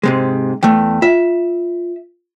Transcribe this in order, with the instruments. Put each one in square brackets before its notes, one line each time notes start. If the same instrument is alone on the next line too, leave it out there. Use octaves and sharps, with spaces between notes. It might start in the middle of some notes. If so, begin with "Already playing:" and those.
[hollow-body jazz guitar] G#2 C3 G#3
[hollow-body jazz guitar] E2 A3 [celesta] G5
[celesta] F4 [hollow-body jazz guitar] E5